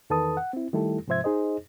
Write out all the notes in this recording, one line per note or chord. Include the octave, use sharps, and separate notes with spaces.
E2 D#3 A4 B4 A5 D#6
F#5
C4 E4
D#3 G3 A3 E4 G4 A4
G#2 C3 F3 C5 E5 G#6
D#4 G#4 C5 D#5